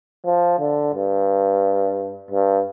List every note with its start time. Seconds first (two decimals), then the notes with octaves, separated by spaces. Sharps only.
0.26 F3
0.60 D3
0.94 G2
2.31 G2